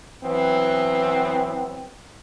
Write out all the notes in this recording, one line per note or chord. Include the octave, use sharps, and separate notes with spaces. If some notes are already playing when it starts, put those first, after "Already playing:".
E3 F#3 B3 C4